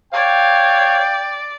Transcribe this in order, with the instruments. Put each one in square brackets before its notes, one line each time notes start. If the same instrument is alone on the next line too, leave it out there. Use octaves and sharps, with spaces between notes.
[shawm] C#5 [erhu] D5 [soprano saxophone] F5 [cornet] G5